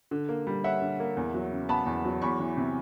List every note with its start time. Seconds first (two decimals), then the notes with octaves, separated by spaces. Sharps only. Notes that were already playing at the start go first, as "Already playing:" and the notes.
0.11 D3
0.29 A#3
0.47 G3
0.64 C#4 E5 F#5
0.81 D3
1.00 A#3
1.17 E2
1.34 F#3
1.52 C#3
1.69 B3 A5 B5
1.86 E2
2.05 F#3
2.22 E2 B5 C#6
2.40 E3
2.57 C3